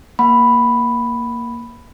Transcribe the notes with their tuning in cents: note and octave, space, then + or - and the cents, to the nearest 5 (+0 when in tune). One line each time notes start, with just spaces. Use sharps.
A#3 +0 F#5 +0 B5 +0